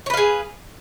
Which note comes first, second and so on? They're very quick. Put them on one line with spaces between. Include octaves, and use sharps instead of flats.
C#5 B4 F5 G#4